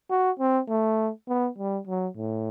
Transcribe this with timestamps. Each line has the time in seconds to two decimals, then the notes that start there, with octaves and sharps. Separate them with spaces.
0.10 F#4
0.39 C4
0.69 A3
1.28 B3
1.58 G3
1.87 F#3
2.17 A2